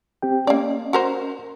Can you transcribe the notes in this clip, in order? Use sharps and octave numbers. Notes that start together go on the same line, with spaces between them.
C4 G4 G5
A#3 C#4 D5 D#5
F#4 A#4 C5